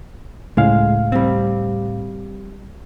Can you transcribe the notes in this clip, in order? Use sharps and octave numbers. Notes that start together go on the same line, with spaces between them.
C#2 A2 G#3 F5
G3 C4